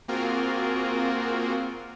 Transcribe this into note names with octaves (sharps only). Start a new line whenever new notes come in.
A#3 C4 F4 F#4 G#4 A#4